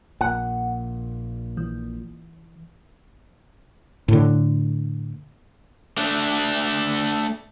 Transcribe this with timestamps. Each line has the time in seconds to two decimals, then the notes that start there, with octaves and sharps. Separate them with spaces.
0.21 A#1 A#2 F#5
1.57 E3
4.08 A2 D3
5.97 A3 D4